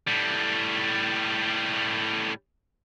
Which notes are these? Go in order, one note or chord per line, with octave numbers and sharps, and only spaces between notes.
A2 G3